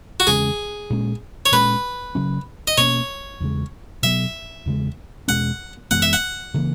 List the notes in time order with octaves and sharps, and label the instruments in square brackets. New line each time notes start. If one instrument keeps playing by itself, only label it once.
[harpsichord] F#4
[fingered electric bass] E2 C#3 G#3 C#4 [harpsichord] G#4
[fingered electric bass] A#2 G#3 C#4
[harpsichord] C#5
[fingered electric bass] A#2 G#3 C#4 [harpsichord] B4
[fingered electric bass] C#3 F#3 C#4
[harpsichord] D#5
[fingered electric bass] B2 A#3 C#4 [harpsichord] C#5
[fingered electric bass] E2 C#3 G#3
[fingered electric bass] B2 F#3 B3 [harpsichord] E5
[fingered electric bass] E2 C#3 G#3
[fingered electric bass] E2 B2 G#3 C#4 [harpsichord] F#5
[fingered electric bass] F#2 E3 G#3 B3 [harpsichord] F#5
[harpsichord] E5
F#5
[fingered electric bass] C#3 E3 A#3